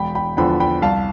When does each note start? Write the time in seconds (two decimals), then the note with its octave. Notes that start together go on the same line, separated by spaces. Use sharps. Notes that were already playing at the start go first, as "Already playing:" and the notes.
Already playing: E1 G5 B5
0.15 G5 B5
0.37 E2 D3 F3 G5 B5
0.60 G5 B5
0.82 C2 F5 A5